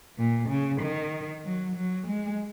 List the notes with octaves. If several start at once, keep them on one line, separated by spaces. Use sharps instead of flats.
A#2
C#3
D#3
F#3
F#3
G#3